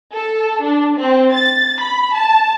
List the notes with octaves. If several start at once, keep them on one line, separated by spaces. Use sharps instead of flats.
A4
D4
C4
A6
B5
A5